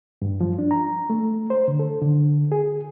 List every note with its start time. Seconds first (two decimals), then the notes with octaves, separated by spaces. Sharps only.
0.22 G2
0.41 F3
0.58 D4
0.71 A#5
1.10 A3
1.50 C5
1.68 D3
1.79 A4
2.02 D3
2.52 G#4